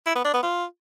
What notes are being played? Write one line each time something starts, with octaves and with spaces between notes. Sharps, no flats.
E4
B3
D4
B3
F4